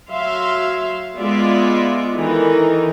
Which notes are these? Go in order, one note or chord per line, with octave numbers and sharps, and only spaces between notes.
F#3 E5 F5 C6
G#3 B3 F4 D5 E5
D#3 E3 D#4 A4 A#4